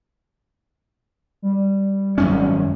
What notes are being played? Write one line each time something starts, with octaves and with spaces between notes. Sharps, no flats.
G3
G#1 F#2 C#4